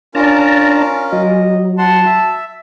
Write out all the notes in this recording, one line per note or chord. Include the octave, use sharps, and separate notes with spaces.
C#4 D4 F4 A#4 A5 A#5
F#3 D#5
F#5 A5 C6
E5